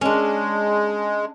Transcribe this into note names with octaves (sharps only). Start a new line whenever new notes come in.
G#3 C#4 D4